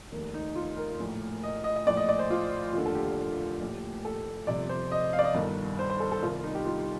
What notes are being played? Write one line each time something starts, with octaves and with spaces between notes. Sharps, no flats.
F1 D#2 D#3
D#4
F4
A#4
A#1 A2
D#5
D#5
D#5
A#1 A2 D5
D#5
D5
C5
F4
F1 D#2 D3 F4
A4
G4
A#1 A2
A4
G1 F2 C3 D5
C5
D#5
F5
D5
D#5
G1 G2 D#3
C5
C5
A4
A4
C2 C3 D#3 F4
D#4
G4
F4
G4